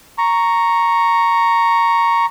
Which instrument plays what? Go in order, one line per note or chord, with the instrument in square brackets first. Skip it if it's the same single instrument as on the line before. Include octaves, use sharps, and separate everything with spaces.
[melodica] A#5 C#6